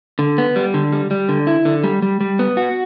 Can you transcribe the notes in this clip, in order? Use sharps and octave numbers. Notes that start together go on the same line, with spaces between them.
D3
B3
G3
D3
G3
G3
D3
E4
D3
G3
G3
G3
B3
F#4